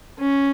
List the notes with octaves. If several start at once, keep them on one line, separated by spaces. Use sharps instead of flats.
C#4